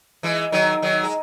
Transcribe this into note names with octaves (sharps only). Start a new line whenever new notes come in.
E3 G#3
D#3 F#3
D#3 F#3
G#3